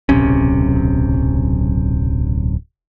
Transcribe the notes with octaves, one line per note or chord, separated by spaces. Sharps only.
D1 B1 C3 C#4